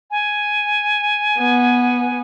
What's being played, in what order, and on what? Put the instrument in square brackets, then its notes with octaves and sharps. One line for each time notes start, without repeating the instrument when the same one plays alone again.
[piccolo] G#5
[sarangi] B3